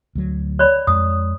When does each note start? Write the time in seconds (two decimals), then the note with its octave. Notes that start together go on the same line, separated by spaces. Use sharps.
0.15 D2 F#3
0.59 C#5 D5 B5
0.87 F2 G#3 D#6